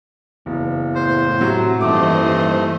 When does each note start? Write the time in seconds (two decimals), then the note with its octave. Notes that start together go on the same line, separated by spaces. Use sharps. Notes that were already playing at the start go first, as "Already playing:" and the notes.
0.46 F#1 E2
0.95 A2 C5
1.41 C3 F#3
1.81 D#1 G2 E3 A3 C5 D#5 D6